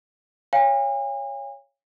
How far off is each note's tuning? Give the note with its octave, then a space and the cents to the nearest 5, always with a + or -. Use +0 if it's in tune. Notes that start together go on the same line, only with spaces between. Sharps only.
C#5 +0 F5 +0 G#5 -40